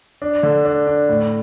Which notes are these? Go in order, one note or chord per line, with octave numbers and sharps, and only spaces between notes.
D4
D3
D4
D4
A2